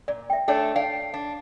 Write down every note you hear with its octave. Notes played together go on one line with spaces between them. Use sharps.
A#2 D5
E5 G5
A3 D4 A4 C#5 D5 G5
D5 F5 G5
D4